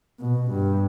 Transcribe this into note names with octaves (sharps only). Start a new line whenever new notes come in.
B2
G2